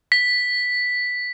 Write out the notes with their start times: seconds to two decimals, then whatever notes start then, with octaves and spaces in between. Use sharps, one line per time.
0.12 B6